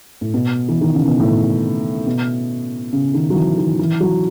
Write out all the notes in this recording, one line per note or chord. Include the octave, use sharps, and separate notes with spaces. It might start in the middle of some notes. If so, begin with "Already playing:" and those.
A2
B2
E3
D#3
C#3
B2
A2
B2
C#3
D#3
F#3
E3
D#3
E3
F#3